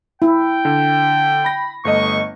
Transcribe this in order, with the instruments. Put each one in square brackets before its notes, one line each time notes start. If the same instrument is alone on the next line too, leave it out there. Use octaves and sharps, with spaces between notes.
[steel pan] E4 [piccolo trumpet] G5
[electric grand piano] D3
B5 A#6
[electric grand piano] G1 A3 D#5 [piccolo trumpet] C#6